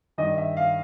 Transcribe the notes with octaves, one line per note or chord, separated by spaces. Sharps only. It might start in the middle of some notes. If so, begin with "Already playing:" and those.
G2 D#3 D#5
E5
F5